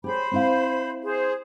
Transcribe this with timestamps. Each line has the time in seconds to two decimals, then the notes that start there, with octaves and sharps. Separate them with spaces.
0.04 G4 G#4 C5 C#5 B5
0.32 C4 E4 F5
1.03 G#4 C5